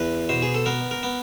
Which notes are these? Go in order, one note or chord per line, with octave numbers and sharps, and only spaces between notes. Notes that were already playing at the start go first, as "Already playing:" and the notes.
Already playing: E2 B4
B2 C5
G#4
A4
B3 A#4
A#4
B3